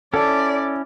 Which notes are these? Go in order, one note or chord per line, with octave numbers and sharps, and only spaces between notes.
C#4 E4 A4 D5